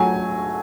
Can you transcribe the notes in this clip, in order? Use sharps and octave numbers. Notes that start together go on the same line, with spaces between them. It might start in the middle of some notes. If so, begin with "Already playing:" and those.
Already playing: F#3 A3 G#5